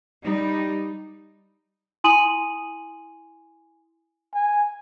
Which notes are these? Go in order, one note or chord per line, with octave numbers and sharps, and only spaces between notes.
G3 D#4
E4 G#5 C6 D#6 D#7 F#7
G#5